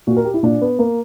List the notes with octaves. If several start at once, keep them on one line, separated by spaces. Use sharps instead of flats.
A#2 F#4
A#4
G4
E4
A#2 D4
B3
A#3